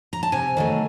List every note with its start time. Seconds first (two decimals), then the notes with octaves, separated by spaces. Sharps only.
0.13 A#5
0.23 A5
0.32 C3 G#5
0.57 D#3 F#3 A3